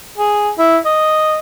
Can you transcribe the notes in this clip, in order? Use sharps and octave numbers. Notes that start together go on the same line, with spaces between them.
G#4
E4
D#5